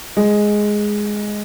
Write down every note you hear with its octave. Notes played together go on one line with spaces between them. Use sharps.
G#3